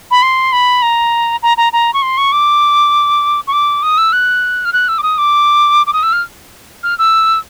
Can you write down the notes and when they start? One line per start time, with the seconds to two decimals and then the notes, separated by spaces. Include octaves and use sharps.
0.11 B5
0.22 C6
0.52 B5
0.82 A#5
1.42 A#5
1.57 A#5
1.73 A#5
1.93 C#6
2.02 C6
2.17 C#6
2.32 D6
3.47 C#6
3.53 D6
3.83 D#6
3.98 E6
4.12 F#6
4.65 F6
4.73 F#6
4.88 E6
4.98 D6
5.03 D#6
5.18 D6
5.86 D6
5.93 D#6
6.03 E6
6.13 F6
6.83 F6
6.98 E6